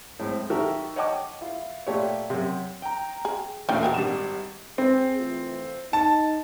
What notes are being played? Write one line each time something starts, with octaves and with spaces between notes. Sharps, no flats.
A2 G#3 C4
D#3 F#4 G4 A4 A#4 E5
C#5 D#5 F#5 G5 A5 D6
E4 F4
A#2 A3 G4 C#5
F#2 C3
G5 A#5
G#4
E1 A#2 A3 C#4 F4 G5
F#4 G#4 A#4
G#1 G3 E7
C4 G#4
E3 A3 F4
D#4 A5